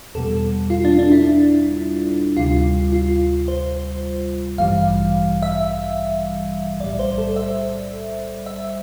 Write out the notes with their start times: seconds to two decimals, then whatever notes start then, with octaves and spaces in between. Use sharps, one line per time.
0.15 E2 B2 G3 A4
0.70 F4
0.85 D4
0.99 D4
1.12 E4
2.37 D2 C3 G3 F4
2.92 F4
3.48 C5
4.58 A1 G2 E3 G3 F5
5.43 E5
6.80 B1 A2 G3 D5
6.99 C5
7.18 A4
7.36 E5
8.46 E5